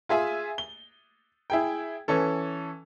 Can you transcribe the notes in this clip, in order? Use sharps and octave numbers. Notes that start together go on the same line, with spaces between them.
F4 G#4 E5 G#5
G7
E4 G#4 G5
E3 C#4 A4